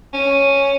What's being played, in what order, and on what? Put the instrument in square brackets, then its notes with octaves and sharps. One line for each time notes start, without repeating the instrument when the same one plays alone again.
[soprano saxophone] C#4